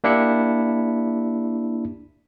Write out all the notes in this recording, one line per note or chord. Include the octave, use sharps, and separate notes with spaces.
A#3 D4 E4 G4 C#7